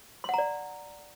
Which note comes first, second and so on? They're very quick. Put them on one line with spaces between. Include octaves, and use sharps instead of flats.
C6 F#5 A#5 D5